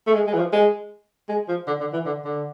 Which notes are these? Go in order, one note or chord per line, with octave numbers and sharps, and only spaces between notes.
A3
G#3
G#3
E3
F3
G#3
G#3
F3
D3
D3
E3
D3
D3